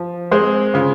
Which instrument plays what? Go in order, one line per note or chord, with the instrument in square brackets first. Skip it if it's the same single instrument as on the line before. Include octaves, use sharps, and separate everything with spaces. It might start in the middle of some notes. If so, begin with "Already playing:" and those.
Already playing: [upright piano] F3
[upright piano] G#3 C4 [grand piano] G#4 C5
[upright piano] C#3 [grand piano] F4 G#4